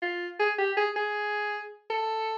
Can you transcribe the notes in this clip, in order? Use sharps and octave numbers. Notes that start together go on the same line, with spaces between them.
F4
G#4
G4
G#4
G#4
A4